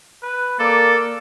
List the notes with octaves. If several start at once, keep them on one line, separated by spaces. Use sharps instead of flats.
B4
A#3 A4 D5